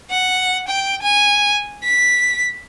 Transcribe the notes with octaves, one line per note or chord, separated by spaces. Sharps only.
F#5
G5
G#5
B6